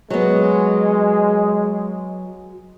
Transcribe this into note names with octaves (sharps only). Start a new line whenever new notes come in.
F#3 G#3 B3